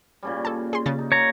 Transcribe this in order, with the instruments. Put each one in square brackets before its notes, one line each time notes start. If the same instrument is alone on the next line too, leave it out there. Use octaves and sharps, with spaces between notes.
[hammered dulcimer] A#2 C#3 G3
[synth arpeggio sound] A4 A5
G#4 C6
C#3 A6
[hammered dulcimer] D#4
[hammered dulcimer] A#3 [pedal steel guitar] C#5 A#5